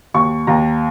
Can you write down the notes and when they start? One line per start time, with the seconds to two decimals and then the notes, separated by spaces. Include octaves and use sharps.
0.14 D#2 C#6
0.47 D#2 A#5